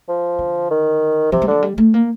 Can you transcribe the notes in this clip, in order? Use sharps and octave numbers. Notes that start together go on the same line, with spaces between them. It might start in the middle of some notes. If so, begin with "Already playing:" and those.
F3
D3
D#3
C3 F3
G3
D3 F3
G3
A3
A#3